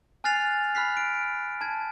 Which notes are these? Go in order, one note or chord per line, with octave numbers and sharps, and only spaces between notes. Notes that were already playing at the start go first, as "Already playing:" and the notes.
G#5 F6 F#6 A6 C7 F7
B5 F6 F#6 B6 C7
D7
A5 G#6